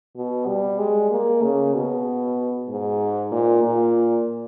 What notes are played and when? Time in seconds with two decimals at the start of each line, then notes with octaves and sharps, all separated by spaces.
0.16 B2
0.47 G3
0.79 G#3
1.11 A#3
1.43 C#3
1.74 B2
2.69 G#2
3.32 A#2
3.63 A#2